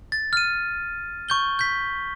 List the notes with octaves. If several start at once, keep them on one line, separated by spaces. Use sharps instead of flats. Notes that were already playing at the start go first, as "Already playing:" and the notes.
A6
F6 D#7
C#6 G6 G7
G6 B6